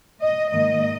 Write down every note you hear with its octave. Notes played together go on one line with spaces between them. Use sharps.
D#5
G#2 D#3 A#3 D#5